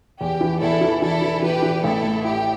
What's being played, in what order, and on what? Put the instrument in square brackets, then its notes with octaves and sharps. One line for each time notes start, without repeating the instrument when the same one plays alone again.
[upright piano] E2 [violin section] G4
[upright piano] E3
[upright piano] E2 [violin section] E4 A4
[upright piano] E3
[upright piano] E3 [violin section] E4 A4
[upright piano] E3
[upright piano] E3 [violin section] G4 B4
[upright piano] E3
[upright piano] A1 [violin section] E4 A4
[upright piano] A2
[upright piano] E4 [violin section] G4